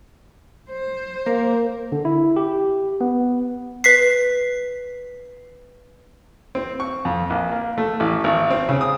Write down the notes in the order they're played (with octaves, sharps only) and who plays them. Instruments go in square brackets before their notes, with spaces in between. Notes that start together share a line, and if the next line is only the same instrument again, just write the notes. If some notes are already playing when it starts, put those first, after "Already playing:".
[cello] C5
[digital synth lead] A#3 [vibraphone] A#4
[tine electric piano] D3
E4
G4
B3
[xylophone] B4 B6 C7
[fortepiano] C4
C#6
F2
A#1
A#3
A3
A1
G#1
C4
C#3
D#6